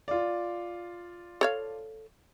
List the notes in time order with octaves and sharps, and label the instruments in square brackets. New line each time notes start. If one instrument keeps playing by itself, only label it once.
[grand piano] F4 D5
[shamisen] A4 C#5 F5